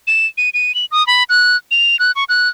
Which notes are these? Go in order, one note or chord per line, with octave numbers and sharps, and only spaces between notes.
E7
D#7
D#7
F#7
D#6
B5
F#6
F7
F#6
C#6
F#6